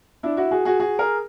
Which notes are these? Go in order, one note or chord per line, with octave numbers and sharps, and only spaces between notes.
D4 E4
E4 F#4
F#4 G#4
F#4 G#4
F#4 G#4
G#4 A#4